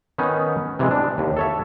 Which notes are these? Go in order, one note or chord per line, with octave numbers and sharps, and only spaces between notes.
D#3 B3 C#4 D#4
C3 E3 G#3
D4
D#2
A4 C#5 E5